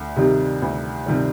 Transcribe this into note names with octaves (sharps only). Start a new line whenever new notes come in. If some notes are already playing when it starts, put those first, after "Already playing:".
Already playing: D2
C3 D#3 G3
D2
C3 D#3 G3